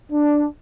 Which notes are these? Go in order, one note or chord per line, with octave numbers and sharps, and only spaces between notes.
D4